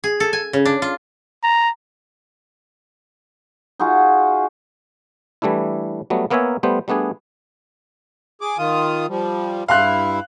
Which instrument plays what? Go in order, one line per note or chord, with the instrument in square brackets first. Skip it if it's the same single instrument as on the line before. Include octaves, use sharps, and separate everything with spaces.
[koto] G#4
A4
G#5
C#3
D4
F4
[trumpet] A#5
[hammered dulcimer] D#4 F4 F#4 G#4
[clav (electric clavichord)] E3 G3 A3 D4 E4
F#3 G3 A3 B3
A#3 B3 A#4 C#5 E5 G#5
G3 A3 B3 C5
G3 A3 B3 D4 G#4
[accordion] G#4 D6
D#3 F4 D#6
F3 G3
[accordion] G2 E4 [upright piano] F5 C6 F#6